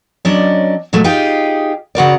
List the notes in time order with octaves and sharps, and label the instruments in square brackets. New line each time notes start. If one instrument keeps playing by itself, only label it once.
[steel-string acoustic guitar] F#3 C#4 D4 D5 D#5
A#2 F#3 G#3 A3
D#4 F4 G4 G#4
C#3 F#4 A#4 D5